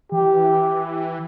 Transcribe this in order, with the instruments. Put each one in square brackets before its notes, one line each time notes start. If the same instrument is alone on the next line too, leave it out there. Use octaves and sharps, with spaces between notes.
[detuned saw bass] E3 [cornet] G4